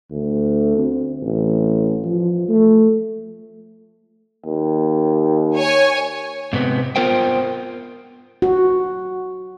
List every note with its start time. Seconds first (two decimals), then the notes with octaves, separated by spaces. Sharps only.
0.11 D2
0.78 C4
1.22 A1
2.04 F3
2.48 A3
4.46 D#2
5.56 C#5 G#5
6.53 G#2 C3 B3
6.96 B3 F4 A#4 C5 G5
8.42 F#4